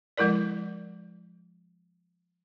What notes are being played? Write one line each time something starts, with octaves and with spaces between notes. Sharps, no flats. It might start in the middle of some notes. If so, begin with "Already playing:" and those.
F3 G#3 E4 A#4 D5